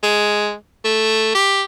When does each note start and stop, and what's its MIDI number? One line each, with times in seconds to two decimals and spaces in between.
0.03 0.54 56
0.85 1.34 57
1.35 1.62 67